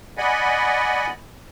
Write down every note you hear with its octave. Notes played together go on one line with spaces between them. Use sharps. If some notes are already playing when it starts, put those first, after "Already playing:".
D5 D#5 F#5 G#5 B5